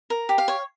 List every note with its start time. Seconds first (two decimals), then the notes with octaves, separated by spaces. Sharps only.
0.10 A#4
0.29 G4
0.38 F5
0.48 C#5